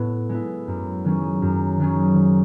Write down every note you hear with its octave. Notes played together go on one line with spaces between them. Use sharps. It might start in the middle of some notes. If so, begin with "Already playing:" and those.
Already playing: A2 B3 E4
G#3 B3 E4
F#2
D#3 F#3 C#4 G#4
F#2
D#3 F#3 C#4 G#4
D#3